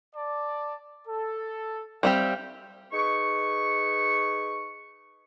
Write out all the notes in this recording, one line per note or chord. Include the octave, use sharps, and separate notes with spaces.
D5 A5
A4
G3 C4 G4 E5 F5
D#4 G#4 B4 C#6